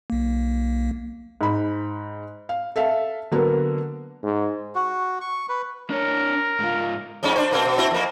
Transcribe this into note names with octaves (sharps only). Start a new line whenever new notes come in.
B1 A#3
G#2 B5
F5
A4 E5 F5 A5
D3 F#3 A#3 B3 A#4
G#2
F#4
C#6
B4
D4 A#4 C#5
G#2 F4
F2 G#2 C#4
D4 C5
B2 A#3 C4
B2
C4 E4 F#4
F2 A#3